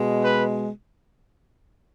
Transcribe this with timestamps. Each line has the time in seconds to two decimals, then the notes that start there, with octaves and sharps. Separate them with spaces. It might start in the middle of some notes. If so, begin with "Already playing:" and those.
Already playing: B2 G#3
0.23 B4